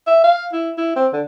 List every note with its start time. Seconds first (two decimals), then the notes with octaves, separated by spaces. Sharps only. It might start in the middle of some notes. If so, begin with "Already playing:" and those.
0.07 E5
0.24 F5
0.53 E4
0.78 E4
0.96 C4
1.13 D3